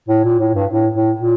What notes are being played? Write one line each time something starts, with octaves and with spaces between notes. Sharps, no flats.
A2
A#2
A2
G2
A2
A2
A#2